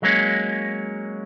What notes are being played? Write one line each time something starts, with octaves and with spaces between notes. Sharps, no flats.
F#3 G#3 A#3 C#4